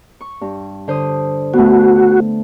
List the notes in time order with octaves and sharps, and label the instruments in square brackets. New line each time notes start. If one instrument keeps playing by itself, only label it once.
[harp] C#6
G2
D3 C5 D#6
[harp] A3 B3 [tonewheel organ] F#4